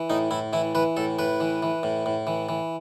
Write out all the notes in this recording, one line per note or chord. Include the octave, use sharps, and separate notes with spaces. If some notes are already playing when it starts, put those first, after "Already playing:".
Already playing: E3
A2 D#4
A2 E4
E3 E4
E3 B4
A2 A4
A2 B4
E3
E3
A2
A2
E3
E3